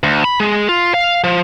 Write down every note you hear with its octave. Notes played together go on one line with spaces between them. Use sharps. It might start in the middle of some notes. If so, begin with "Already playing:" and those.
D2
B5
G#3
F4
F5
F3